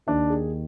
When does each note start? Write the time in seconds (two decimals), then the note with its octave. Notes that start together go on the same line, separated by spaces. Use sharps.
0.07 D#2 D#3 D4
0.30 G#4